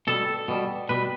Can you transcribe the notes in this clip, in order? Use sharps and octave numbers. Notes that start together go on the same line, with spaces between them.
B2 G3 A4
B2 G3
B2 G3 B4